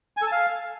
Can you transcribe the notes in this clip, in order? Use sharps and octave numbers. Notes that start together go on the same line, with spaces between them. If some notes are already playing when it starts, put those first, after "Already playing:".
G#5
A4
A5
F5